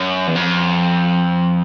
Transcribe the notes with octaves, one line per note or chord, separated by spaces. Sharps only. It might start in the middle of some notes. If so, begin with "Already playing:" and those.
Already playing: F#2
E2
F2